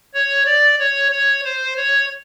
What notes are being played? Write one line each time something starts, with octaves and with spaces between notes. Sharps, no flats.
C#5
D5
C#5
C#5
C5
C#5